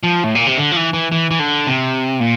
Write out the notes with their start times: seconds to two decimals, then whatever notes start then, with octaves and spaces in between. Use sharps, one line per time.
0.03 F3
0.24 A2
0.35 A#2
0.47 C3
0.57 D3
0.72 F3
0.76 E3
0.93 E3
1.12 E3
1.31 E3
1.39 D3
1.67 C3
2.20 A#2